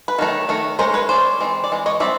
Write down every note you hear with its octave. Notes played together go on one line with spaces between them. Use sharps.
B4
D#3 F#3 A3
D#3 F#3 A3
G#3 C#4 A#4 C5
B4 C#5
G#3 C#4 C5 D5
E3 G#3 C4
D5
E3 G#3
C#5 D#5
G3 C4 D5 E5